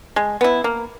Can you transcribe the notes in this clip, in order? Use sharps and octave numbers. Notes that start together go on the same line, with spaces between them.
G#3
B3 E4
A#3